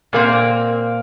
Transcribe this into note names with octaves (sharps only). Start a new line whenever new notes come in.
A#2 A#3 C4